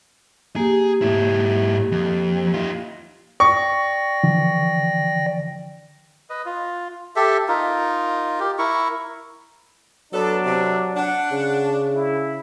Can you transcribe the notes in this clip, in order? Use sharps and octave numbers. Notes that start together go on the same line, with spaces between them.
A#3 G4 G#4
G#2 E4
F2
D#4 F4
D5 G5 C#6 A#6
D3 E3 F3
B4 D#5
F4
G4 A4 E5
D#4 F4 A#4
G4
E4 A#4 C#6
F#3 B3 D4 A4
C3
D4 F#5
C#3
E4